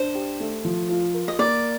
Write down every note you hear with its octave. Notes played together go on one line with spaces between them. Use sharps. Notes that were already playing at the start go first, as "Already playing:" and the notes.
Already playing: D4 C5
G4
A3
F3
F4
A#4
D#5
A#3 D5